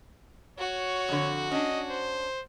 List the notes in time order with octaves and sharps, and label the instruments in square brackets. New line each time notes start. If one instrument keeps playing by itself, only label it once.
[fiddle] F#4 [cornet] C#5
[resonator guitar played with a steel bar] F2 D3
[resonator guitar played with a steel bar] C#4 D4 [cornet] D#5
[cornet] C5